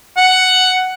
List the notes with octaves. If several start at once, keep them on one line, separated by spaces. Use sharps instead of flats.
F#5